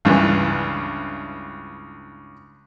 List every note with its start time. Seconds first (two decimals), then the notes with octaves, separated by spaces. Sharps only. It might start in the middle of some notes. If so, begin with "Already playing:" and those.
0.05 C#2 G2 E3